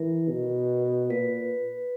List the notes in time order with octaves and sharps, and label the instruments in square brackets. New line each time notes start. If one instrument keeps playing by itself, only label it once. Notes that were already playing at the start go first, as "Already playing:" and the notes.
Already playing: [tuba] E3 [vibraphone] A#4
[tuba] B2
[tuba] A#2 [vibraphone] B4